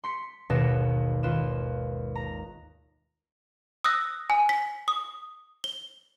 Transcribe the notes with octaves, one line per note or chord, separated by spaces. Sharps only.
C6 B6 C#7
G#1 D#2 B2 B3 A#6 E7
D#2 F4 B4 E7
A#5
D#6 E6 F#6 A#6
G#5
B6
D#6
G7